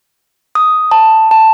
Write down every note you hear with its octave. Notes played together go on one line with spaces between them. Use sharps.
D#6
A5
A5